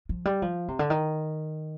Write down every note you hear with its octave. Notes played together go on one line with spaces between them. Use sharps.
F3
G3
F3
C3
D3
D#3